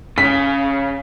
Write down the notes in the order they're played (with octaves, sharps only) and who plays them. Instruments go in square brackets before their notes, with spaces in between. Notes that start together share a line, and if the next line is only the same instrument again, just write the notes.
[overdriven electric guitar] C#3 [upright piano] B6